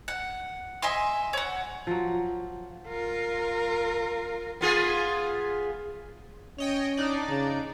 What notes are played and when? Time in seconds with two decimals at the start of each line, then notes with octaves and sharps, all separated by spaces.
0.08 F#5
0.82 D#5 E5 G#5 C6
1.33 C#5 F#5
1.87 F3 F#3
2.88 F4 A#4
4.61 B3 F4 G#4
6.58 C#4 C#5 D#5 G5
6.97 D4 D#4 D5
7.29 C#3